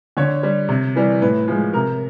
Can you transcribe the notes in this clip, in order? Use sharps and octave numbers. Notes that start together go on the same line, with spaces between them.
D3 C#5
G3
C3
E3 G3
A2 B4
F3 G#3
C3 A#4